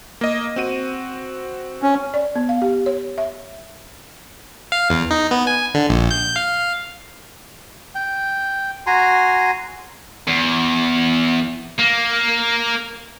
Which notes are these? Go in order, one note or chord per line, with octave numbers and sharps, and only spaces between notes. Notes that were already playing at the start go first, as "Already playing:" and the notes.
A#3 D#5
C4 F#4 D#7
C#4
D5
B3
F5
G4
C#5
E5
F5
E2
D#4
B3
G#5
D3
A#1
G6
F5
G5
F#4 G#5 A#5 C6
E2
A#3